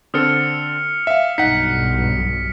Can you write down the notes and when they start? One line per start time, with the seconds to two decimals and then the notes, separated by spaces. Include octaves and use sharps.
0.14 D3 C4 A4 D#6 F6 C#7
1.07 E5 F5
1.38 B1 G2 D#4 F#5 B6 C#7